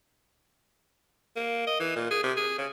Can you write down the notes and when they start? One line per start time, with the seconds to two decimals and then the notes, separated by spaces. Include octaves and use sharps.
1.36 A#3
1.67 D#5
1.80 E3
1.96 A#2
2.11 G#4
2.23 C3
2.37 G#4
2.58 C#3